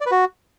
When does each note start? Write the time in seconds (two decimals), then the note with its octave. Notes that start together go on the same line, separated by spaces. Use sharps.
0.01 D5
0.06 B4
0.11 F#4